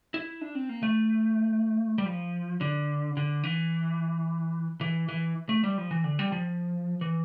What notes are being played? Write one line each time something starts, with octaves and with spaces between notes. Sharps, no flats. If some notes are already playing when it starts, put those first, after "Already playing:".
E4
D4
C4
A#3
A3
G3
F3
D3
D3
E3
E3
E3
A3
G3
F3
E3
D3
G3
F3
E3